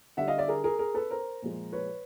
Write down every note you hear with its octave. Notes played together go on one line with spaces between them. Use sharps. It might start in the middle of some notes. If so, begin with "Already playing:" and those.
D3 G3 E5 F#5
D#5 F5
D5 E5
G#4 A#4
G#4 A#4
G#4 A#4
A4 B4
A#4 C5
A#2 F3 G#3
B4 C#5